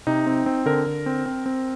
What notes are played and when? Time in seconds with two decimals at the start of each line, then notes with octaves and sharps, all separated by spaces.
0.07 C3 D#4
0.26 C4
0.46 C4
0.66 D3 A#4
0.86 D3
1.06 C4
1.26 C4
1.46 C4